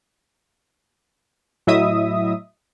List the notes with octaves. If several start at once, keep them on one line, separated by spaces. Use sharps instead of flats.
A2 F#3 E4 D#5 E5 D#6